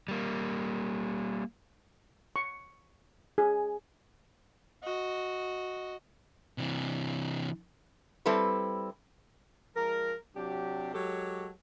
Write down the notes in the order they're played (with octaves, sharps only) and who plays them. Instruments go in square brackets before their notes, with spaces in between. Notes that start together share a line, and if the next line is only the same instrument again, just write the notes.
[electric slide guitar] G3 A#3
[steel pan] C#6
G#4
[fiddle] F#4 D#5
[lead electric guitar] C3 E3
[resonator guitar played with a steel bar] G3 C4 E4 A4 B4
[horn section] F3 G#3 A#4
C3 F#3 D4 G4
F#3 G#3 G4 A4 C#5